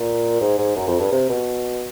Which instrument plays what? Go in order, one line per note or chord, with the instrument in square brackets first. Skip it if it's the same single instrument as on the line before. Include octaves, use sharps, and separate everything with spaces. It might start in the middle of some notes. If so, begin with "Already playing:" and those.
Already playing: [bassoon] A#2
G#2
G#2
F#2
F2
G2
C3
B2